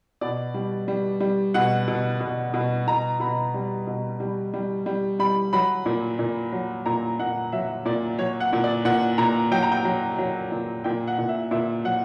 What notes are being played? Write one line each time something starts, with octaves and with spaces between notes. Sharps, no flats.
B2 D5
G3
G3
G3
B2 F#5
B2
B2
B2
B2 A#5
B2 B5
G3
B2
G3
G3
G3
G3 B5
F#3 B5
A#2
A#2
F#3
A#2 A#5
A#2 F#5
F#3 E5
A#2 D5
F#3 C#5
F#5
A#2
D5
A#2 F#5
A#2 A#5
F#3 G5
A#5
G5
F#3
F#3
A#2
A#2 G5
F#5
A#2
E5
A#2 E5
F#3 F#5